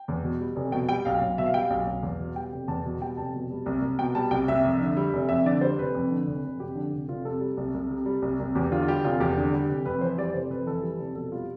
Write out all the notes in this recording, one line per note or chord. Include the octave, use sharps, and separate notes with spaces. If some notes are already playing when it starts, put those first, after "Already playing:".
Already playing: G5
E2
B2
G3
F1
B2 G5
G3 G5
B1 F5
B1
B2 E5
F5
G3 G5
F5
B1
B1
E2
B2
G3 G5
F1
E2 A5
B2
G3 G5
F1 A5
B2
G3
C2
C2
B2 G5
G3 A5
C2 G5
C2 E5
F2
D3
G3
F1
F2 E5
D3 D5
G3 C5
F1 B4
F2
D3
F1
F1
F2 G4
D3
F1
F1 F4
C3 A4
G3
C2
C2
C3
G3
C2
C2
E2 G4
D3 F4
F4
G3 G4
F1 F4
E2 G4
D3
G3
F1
F2 B4
E3 C5
G3 D5
F1 C5
F2 B4
E3 A4
G3
F1
B2 A4
G3 F4